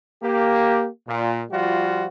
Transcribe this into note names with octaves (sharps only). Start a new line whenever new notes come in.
A#3 G4
A#2
F3 G3 F4 F#4